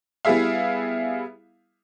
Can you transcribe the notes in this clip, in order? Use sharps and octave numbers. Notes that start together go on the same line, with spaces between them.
G3 B3 E4 G#4 E5 F5